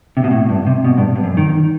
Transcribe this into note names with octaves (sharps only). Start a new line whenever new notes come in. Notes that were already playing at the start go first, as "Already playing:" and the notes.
C3
B2
A2
G2
C3
B2
G2
G2
F#2
D#3